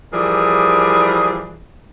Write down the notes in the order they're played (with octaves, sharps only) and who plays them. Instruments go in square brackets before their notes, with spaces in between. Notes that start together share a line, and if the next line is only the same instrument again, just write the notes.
[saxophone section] E3 F3 G3 G#4 A#4 D5